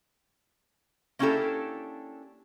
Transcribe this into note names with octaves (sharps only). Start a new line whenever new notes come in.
A#3 C#4 D4 E4 G4 A4